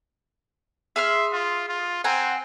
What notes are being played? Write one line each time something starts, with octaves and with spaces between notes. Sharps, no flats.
G#4 E5 C6 F6
F4
F4
C4 F#5 G#5 A#5